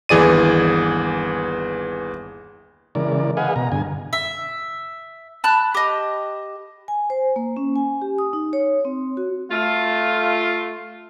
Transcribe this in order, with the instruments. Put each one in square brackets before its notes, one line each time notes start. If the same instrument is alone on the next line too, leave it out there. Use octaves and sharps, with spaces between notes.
[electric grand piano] G1 D#2 E3 G#4 D5 D#7
[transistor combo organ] C#3 E3 G#3 A#4 D5
G#4 B4 D#5 F5 F#5 G#5
B2 A#5
G2 D3 G#5
[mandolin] E5
A5 B5 F#6
G4 D#5
[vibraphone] G#5
C5
A#3
C#4
G#5
G4
D#6
D#4
C#5
C4
F#4
[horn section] A3 F4